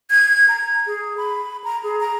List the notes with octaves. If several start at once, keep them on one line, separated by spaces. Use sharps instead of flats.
G#6
A#5
G#4
B5
A#5
G#4
A#5